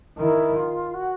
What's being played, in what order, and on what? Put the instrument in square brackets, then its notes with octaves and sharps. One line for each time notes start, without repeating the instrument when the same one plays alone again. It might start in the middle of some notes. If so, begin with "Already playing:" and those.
[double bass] D#3 [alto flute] E4
[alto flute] F4
F#4